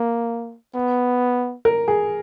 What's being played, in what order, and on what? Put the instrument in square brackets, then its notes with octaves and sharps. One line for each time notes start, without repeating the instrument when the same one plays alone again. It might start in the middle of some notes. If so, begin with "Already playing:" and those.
Already playing: [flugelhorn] A#3
B3
[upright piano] A#4
G#4